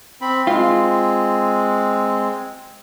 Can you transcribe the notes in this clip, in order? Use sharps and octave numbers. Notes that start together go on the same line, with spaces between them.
C4 B5
G#3 C4 F4